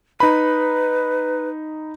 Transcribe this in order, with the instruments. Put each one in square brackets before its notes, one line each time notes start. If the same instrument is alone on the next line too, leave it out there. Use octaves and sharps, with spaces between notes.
[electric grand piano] D#4 B5 [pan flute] B4